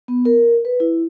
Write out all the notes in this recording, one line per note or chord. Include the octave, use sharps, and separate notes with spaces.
B3
A#4
B4
E4